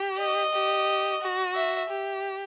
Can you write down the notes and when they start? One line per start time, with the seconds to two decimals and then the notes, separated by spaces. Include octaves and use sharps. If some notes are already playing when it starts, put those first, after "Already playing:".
Already playing: G4
0.19 D#5
0.53 G4
1.21 F#4
1.55 E5
1.89 G4